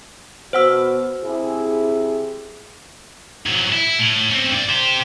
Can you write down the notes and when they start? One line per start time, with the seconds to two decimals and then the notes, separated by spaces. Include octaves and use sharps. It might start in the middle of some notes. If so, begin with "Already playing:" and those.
0.53 B2 B3 F#4 C5 F#5 E6
1.24 C3 E4 G#4
3.46 G#2 F#3
3.72 E4
3.99 A2
4.31 C4 C#4
4.52 G2 D5
4.69 G4 C5